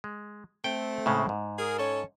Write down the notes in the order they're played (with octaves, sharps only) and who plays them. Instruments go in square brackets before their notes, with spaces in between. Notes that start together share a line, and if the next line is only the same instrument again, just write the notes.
[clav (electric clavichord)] G#3
[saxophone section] A3 C4 [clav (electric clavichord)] G5
[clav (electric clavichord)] A2 C#3 G#3
G#2
[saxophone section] G#4 A#4
C#4 A4 C#5